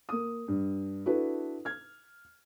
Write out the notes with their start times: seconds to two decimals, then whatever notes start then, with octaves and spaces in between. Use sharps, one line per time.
0.09 A#3 D#6
0.48 G2
1.06 D4 E4 F#4 A4 B4
1.65 F6 G#6